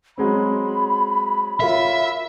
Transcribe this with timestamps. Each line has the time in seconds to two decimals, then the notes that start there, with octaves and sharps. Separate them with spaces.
0.18 F#3 G#3 C4 B5
1.60 F4 A#4 C#5 E5